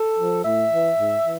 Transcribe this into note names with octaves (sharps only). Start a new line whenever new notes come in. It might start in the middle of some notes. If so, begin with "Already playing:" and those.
Already playing: A4
F3
A2 E5
E3
G#2
E3